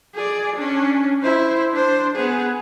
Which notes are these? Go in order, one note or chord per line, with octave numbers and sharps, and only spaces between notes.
G#4 D5
C#4 D4
E4 C5
D4 C5
B3 G#4